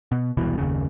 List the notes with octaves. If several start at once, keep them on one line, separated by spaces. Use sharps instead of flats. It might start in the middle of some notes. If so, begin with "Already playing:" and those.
B2
E1 C2 B2 E3
F#1 D#2 C#3